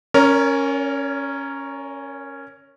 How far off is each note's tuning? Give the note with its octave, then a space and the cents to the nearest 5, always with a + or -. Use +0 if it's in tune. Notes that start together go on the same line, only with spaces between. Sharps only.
C#4 -5 A#4 +0 C#5 +45